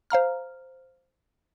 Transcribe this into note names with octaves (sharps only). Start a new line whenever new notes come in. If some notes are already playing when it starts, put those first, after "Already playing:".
C5 F5 A#5 F6